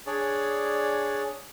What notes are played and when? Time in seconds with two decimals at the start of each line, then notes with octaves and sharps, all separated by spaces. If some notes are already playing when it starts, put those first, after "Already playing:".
0.07 D4 G#4 C#5 D5